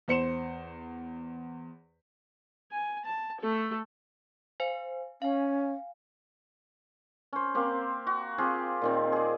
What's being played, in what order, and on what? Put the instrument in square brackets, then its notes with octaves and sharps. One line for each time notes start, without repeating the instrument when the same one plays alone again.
[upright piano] E2 C5 C#7 E7
[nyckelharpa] G#5
A5
A3 A4
[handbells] C5 F5 G#5
[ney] C#4 [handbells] F5 G#5
[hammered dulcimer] C#4 C5
A#3 C4 G4
F#4
C4 F4 G4 G#4
A#2 D#3 C4
G#4 D5